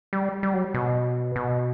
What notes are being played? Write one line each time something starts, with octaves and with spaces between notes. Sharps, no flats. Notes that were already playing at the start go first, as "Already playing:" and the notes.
G3
G3
F#3
B2
B2